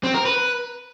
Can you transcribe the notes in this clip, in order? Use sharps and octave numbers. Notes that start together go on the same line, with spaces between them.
C4
A#4
B4